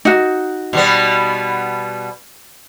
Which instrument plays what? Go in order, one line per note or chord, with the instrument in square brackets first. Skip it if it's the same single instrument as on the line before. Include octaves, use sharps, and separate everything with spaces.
[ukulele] D#4 F#4
[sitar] B2 G3 B3